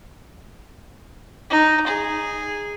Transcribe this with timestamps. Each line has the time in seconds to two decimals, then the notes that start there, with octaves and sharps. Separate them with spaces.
1.50 D#4
1.87 G#4